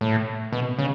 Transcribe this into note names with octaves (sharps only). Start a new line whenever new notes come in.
A2
B2
C#3